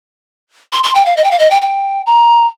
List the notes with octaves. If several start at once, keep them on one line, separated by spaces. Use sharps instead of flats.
C6
C6
G5
F5
D#5
G5
F5
D#5
G5
G5
A#5